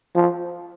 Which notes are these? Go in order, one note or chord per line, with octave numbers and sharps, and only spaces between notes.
F3